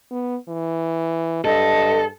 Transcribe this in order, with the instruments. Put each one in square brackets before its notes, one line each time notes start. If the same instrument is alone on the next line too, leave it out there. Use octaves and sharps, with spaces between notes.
[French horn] B3
E3
[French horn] G2 [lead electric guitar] A4 [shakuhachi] D#5